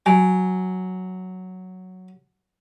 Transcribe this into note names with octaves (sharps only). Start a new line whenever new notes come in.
F#3 G#5